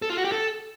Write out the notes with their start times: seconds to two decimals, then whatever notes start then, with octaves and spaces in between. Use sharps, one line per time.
0.02 A4
0.10 F4
0.17 F#4
0.25 G4
0.32 A4